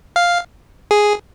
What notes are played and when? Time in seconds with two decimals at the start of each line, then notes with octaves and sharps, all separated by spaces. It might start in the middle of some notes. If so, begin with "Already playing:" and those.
0.16 F5
0.91 G#4